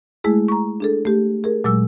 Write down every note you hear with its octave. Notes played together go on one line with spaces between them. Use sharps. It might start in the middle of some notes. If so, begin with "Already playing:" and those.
G#3 A3 E4 G#4
A#5 C#6
D4 G#4 A4
A3 G4
G#4 A#4
A#2 F#3 G#3 E6